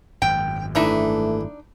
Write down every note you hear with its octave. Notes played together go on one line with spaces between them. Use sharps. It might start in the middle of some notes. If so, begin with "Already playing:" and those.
G#1 F#2 G5
E3 A3 D4 D#4 E5